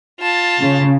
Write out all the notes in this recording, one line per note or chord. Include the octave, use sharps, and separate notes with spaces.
F4 A5
C#3